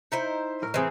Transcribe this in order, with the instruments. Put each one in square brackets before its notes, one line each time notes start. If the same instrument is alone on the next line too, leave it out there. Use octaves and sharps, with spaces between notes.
[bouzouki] D#4 E4 C5
[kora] A2 A#4
[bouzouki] E3 C4 [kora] G#4 C5